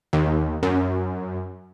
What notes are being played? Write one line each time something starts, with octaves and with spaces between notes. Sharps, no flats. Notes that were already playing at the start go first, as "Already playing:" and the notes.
D#2
F#2